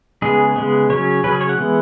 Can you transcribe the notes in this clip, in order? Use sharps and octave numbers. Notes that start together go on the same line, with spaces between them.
C#3 G#3 B3 G#4
C#3 G#3 B3
C#3 F#3 C#4 C#5
C#3 F#3 C#4 B4
G#4
C#5
F#5
E3 G#3 B3